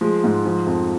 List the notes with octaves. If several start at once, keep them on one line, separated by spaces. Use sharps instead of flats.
F3 G#3
G#2
F3
F2